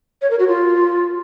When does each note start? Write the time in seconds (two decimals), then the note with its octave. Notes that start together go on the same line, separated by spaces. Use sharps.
0.22 C#5
0.30 A#4
0.39 F#4
0.48 F4